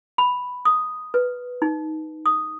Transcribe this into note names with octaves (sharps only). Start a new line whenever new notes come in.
B5
D#6
B4
D#4
D#6